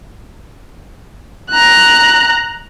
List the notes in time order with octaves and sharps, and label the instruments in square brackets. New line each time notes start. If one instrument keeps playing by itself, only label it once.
[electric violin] A#5 F#6